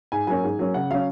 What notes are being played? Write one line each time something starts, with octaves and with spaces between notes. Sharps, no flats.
G#2 G#5
F#3 A#3 C#4 G#5
G#2
F#3 A#3 C#4
C#3 F#5
F#3 C#4 F5